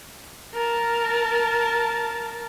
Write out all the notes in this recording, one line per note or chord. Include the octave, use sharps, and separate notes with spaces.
A#4 A5